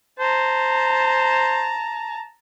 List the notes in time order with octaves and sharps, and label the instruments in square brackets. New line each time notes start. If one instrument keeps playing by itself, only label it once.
[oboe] C5 [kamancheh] A5 A#5